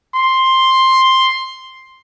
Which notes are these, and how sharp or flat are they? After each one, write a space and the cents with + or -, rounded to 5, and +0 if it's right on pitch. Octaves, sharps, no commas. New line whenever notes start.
C6 +5